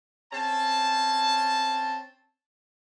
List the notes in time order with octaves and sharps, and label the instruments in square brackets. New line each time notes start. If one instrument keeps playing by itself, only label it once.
[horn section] C4 C#4 A5